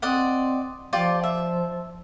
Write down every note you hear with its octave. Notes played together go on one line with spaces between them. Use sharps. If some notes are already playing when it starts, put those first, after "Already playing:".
C4 D5 D#5 F#5
F3 F4 G4 D5
E5